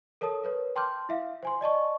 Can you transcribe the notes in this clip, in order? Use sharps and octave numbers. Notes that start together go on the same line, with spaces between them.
A4 A#4 C#5 A5 D#6
A#4 B4 C#5
G5 A5 C6 D6 F6 G6
E4 E5 F5
C5 G#5 C6
D5 D#5 A5 C#6